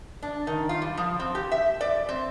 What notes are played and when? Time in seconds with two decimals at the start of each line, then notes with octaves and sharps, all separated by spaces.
0.23 D4
0.47 D#3
0.69 F4
0.82 G3
0.97 F3
1.20 C4
1.35 G4
1.52 E5
1.81 D5
2.09 C4